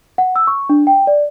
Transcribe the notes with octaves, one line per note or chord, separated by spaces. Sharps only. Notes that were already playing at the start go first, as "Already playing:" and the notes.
F#5
E6
C#6
D4
G5
D5